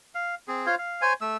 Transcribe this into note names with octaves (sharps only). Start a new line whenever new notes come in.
F5
C4 G#4
F4 C5 C#5 F5
F5
C5 C#5 G#5
A3 E6